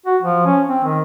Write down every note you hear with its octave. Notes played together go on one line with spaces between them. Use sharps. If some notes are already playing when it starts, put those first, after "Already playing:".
F#4
F3
C#4
C4
D#3